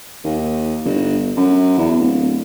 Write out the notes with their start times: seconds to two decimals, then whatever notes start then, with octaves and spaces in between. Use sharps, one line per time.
0.24 D#2
0.85 G1
1.36 F#2
1.78 E2
1.99 D1